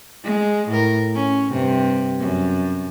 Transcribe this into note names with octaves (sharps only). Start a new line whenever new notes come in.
G#3
A2 A#4
C#4
G2 C3
F#2